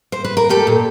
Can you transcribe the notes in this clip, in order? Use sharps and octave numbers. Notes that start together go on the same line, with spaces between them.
C5
B4
A#4
A3 G4 A4
A#2